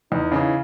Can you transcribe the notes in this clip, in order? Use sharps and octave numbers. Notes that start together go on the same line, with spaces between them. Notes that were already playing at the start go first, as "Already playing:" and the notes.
E2 D#4
C#3 E3